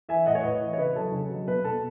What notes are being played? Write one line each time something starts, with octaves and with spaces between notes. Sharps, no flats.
E3 E5 G#5
A2 D#5 F#5
C#5
A2 B4 D#5
E3
C#5
C#3 B4 D#5
F#3 A4 C#5
C#3
F#3
B2 B4
B2 A4